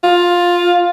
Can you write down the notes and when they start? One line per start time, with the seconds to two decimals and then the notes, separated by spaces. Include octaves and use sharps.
0.03 F4